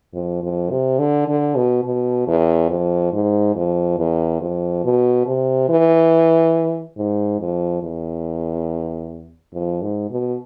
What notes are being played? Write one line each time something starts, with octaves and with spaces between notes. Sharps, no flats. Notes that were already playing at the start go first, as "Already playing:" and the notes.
F2
F2
C3
D3
D3
B2
B2
E2
F2
G#2
F2
E2
F2
B2
C3
E3
G#2
F2
E2
F2
G#2
B2